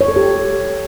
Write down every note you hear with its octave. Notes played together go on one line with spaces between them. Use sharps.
C#5
A4
G4